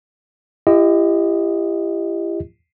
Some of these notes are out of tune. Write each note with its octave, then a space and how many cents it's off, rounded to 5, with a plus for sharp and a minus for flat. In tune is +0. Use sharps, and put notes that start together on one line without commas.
E4 +40 G4 +20 D#5 +0